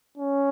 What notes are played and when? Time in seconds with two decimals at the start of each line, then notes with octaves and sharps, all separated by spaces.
0.18 C#4